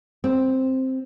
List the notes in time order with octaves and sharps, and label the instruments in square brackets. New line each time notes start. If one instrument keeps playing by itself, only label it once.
[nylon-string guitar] C4